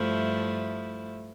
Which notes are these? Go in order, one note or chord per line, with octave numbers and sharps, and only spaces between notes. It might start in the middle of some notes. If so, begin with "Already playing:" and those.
Already playing: G2 F3 A3 E4